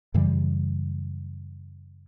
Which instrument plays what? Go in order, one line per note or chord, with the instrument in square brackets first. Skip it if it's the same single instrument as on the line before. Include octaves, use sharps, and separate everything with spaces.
[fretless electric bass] F#2 C#3 E3 G3